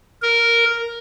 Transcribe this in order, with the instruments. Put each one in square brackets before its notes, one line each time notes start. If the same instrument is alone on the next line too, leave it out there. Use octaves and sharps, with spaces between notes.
[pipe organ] A#4